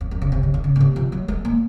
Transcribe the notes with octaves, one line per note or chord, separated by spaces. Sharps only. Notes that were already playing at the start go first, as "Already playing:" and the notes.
F2
F#2
C#3
C3
C#3
D#3
C#3
A#2
C3
F3
F#3
G#3
A#3